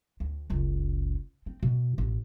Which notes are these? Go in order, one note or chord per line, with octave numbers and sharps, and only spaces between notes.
D2
F#1 C#2
C4
B2
A1